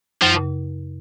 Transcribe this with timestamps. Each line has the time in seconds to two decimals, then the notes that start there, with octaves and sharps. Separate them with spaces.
0.22 F#2 F3
0.36 C#3